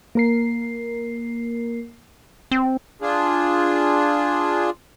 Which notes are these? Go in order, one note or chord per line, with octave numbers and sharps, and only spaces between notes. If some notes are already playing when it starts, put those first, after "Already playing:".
A#3 A#4 C7
C4
D4 F4 G#4